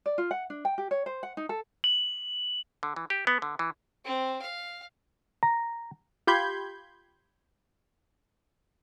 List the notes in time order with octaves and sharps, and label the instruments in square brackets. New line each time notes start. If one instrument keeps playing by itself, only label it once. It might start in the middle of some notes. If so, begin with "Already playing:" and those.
[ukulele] D5
F4
F#5
D4
G5
G4
C#5
C5
F#5
D#4
A4
[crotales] F#7
[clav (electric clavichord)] D3
E3
G4
B3
D3
E3
[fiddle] C4
F5
[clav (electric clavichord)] A#5
[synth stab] F4 G4 B5 C6 G6 G#6